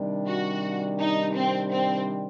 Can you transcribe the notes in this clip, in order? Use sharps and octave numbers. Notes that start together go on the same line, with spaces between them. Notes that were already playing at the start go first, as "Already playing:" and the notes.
Already playing: C3 D#3 G3 D4
F#4
D#4
C4
C4